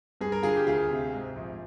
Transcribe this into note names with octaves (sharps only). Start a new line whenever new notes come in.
G2 G#4
A#4
D3 F4 G#4
G4
D2 F4 G#4
C3
G#2
A#1